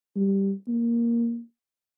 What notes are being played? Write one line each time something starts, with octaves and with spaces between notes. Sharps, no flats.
G3
A#3